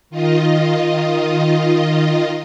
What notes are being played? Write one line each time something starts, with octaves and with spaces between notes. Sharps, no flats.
D#3 F4 D#5